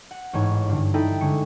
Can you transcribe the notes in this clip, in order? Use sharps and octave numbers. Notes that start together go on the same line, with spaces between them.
F#5
A1 G#2 C#5
G2 D3
D#4 E4 A4 G5
D3 G#3 C#4 C#7